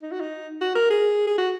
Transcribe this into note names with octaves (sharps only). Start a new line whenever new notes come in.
D#4
F#4
D#4
F#4
A#4
G#4
G#4
F#4